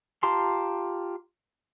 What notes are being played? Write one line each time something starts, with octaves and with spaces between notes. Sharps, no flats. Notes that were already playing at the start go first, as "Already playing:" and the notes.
F4 G4 A5 A#5 C6